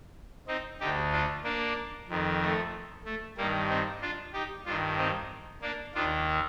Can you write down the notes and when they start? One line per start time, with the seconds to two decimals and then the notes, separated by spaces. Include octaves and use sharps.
0.47 C4 D#4
0.80 D2 D3 D#4 G4
1.12 D4 F4
1.44 A#3 D4
2.08 F2 D#3
2.41 A3
3.05 A3
3.37 G2 D#3 G3 A#3
3.69 C4 D#4
4.01 D4 F4
4.33 D#4 G4
4.65 G2 D#3 D4 F4
4.97 C4 D#4
5.62 A#3 D4
5.94 D#2 D#3 D4 F4